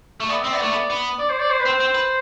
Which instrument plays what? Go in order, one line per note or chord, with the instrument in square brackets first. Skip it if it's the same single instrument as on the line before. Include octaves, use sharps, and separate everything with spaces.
[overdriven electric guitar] A3
[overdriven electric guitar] B3 [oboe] D5
[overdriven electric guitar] C4 [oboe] E5
[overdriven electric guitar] B3 [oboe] D5
[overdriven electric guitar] A3
B3
B3
[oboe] D5
C5
D5
C5
B4
[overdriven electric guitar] C4 [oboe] C5
[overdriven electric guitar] C4
B4